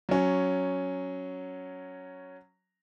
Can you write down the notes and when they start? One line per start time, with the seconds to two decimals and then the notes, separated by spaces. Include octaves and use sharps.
0.09 F#3 C#4